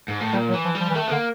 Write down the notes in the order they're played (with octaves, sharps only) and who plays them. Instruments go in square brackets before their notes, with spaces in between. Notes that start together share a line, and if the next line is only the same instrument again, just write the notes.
[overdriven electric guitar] G#2
A2
[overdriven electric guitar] A#2 [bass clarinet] G3
[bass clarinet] F#3
[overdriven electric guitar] E3
[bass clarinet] F3
[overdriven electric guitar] G3
[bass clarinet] F3
E3
[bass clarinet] D#3 [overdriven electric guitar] A3
[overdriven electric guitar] B3
[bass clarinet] D3 [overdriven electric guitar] A#3